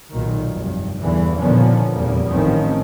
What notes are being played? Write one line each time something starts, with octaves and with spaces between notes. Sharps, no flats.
B1 A#2 D#3
F1 G2
E2 G2 D3 E3
A#2 D3 D#3 F3 B3 C#4
F1 E2 G3 A#3
A1 A2 D#3 F3 C4 C#4